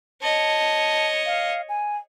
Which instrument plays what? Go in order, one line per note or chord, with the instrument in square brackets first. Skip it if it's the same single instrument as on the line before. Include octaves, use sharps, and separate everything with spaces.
[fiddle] C#5 D#5 [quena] A5
[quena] F5
G#5